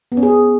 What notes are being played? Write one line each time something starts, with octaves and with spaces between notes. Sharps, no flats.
B3
C#4
G#4